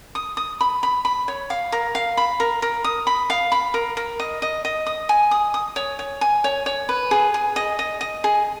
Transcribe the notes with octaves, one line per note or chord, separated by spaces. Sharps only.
D#6
D#6
B5
B5
B5
C#5
F5
A#4
F5
B5
A#4
A#4
D#6
B5
F5
B5
A#4
A#4
D#5
D#5
D#5
D#6
G#5
D#6
D#6
C#5
C#5
G#5
C#5
C#5
B4
G#4
G#4
D#5
D#5
D#5
G#4